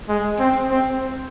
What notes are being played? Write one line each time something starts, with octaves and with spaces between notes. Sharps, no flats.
G#3
C4
C4